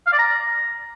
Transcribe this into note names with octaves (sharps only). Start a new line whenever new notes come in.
F5
D5
A#5